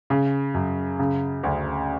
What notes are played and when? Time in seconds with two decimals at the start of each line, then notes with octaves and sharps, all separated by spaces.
0.10 C#3
0.54 F#2
0.99 C#3
1.43 D2